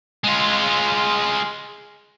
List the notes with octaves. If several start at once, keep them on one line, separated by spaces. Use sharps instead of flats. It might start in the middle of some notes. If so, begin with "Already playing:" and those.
G#3 F4